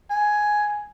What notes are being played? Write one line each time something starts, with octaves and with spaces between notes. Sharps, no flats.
G#5